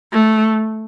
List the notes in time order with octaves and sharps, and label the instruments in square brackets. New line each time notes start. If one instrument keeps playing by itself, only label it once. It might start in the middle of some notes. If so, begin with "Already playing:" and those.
[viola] A3